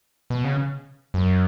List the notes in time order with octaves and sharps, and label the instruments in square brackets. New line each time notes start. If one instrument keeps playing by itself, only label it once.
[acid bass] B2
C#3
F#2